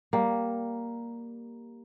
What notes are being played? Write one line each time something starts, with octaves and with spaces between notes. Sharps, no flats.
G3 A#3